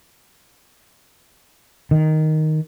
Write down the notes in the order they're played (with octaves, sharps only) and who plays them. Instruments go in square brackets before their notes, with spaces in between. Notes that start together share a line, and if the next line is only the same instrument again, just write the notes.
[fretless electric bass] D#3